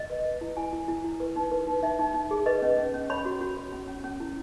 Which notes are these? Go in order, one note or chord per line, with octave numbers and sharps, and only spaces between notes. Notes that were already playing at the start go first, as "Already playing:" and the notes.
Already playing: D#5
B4
B4
E4
E4 G#5
E4
E4
E4
B4
D#4
B4
D#4
D#4 E5
D#4
D#4
G#4
B4 D#5
C#4
C#4
C#4
C#5 B5
F#4
F#4
C#5
C#4
C#4
C#4
E4